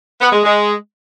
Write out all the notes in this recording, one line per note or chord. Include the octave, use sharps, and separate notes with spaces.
B3
G#3
G#3